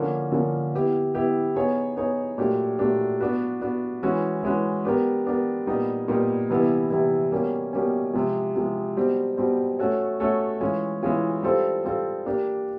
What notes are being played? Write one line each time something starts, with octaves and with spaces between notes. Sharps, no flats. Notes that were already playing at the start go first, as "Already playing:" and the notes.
Already playing: D3 F3 A#3 C#4
D3 F3 A#3 C#4
B3 E4 G4
B3 E4 G4
B3 D#4 G#4 C#5
B3 D#4 G#4 C#5
A#2 F#3 A3 D4 G4
A#2 F#3 A3 D4 G4
B3 D4 F#4 B4
B3 D4 F#4 B4
E3 G#3 C#4 F#4 B4
E3 G#3 C#4 F#4 B4
B3 D4 G4 A#4
B3 D4 G4 A#4
A#2 G3 B3 D#4
A#2 G3 B3 D#4
C3 E3 G3 B3 E4
C3 E3 G3 B3 E4
B2 G3 A#3 C#4
B2 G3 A#3 C#4
C3 F3 G#3
C3 F3 G#3
B2 G3 C4
B2 G3 C4
A3 C#4 F#4 A4 C#5
A3 C#4 F#4 A4 C#5
E3 G#3 C#4 F4
E3 G#3 C#4 F4
G3 C4 F4 A4 C5
G3 C4 F4 A4 C5
A#3 D4 G4